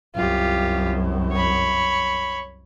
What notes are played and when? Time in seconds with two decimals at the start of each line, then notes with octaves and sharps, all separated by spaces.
0.15 C2 F#2 F4 G4
1.32 C#5 B5